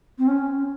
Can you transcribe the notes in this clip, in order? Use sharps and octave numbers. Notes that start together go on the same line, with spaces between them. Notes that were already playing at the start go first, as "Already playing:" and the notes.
C4
C#4